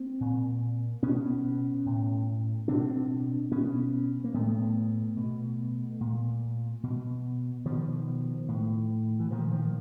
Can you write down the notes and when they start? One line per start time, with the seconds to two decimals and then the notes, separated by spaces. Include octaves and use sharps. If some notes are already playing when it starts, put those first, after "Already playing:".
Already playing: A#3 C4
0.20 A#2
1.02 B2 B3 C#4
1.86 A2
2.68 B2 C4 D4
3.51 B2 B3 C#4
4.24 A#3
4.34 A2 A3 B3
5.17 B2
6.00 A#2
6.83 B2
7.65 B2 D#3 F3
8.48 A2
9.20 E3
9.31 A#2 D#3 F3
9.51 D#3 F3